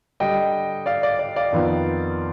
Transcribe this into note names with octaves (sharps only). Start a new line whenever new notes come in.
D3 G3 D4 D#5 G5
D5 F5
D5
D5
D5 F5
F2 D#3 B3 F4